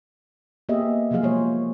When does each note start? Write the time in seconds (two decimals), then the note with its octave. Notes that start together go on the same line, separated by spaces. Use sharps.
0.69 A#3 B3 G4 G#4 D#5 E5
1.11 C3 F3 F#3 A#3 G#4 F5
1.23 C3 G#3 A#3 C5 C#5